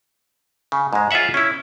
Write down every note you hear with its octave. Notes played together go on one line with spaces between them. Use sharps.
C#3
G#2 G#3
F4 G#4 C#5 E5 F#5
C#4 E4